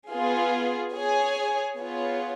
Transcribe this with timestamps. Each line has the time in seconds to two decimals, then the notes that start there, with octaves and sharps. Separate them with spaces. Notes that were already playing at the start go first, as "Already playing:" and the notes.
0.10 B3 F4 G#4
0.94 G#4 C#5 G#5
1.77 B3 F4 G#4 C#5